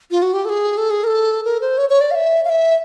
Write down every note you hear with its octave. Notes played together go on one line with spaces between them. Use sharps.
F4
F#4
G4
A4
G#4
A4
G#4
A#4
A4
A#4
C5
C#5
C#5
D5
F5
E5
F5
E5